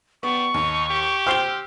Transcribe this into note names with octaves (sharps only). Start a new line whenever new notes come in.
G3 B3 C#6
D#2 D#4
G4
C5 G5 E6 F6 C7 G7